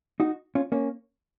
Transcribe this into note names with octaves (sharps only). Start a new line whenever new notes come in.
D#4 F#4
C#4 F4
A#3 C#4